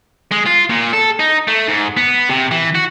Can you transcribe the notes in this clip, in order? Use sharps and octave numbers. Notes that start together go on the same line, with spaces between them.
G#3
F4
A#2
A4
D#4
A3
G#2
B3
C3
E3
F#4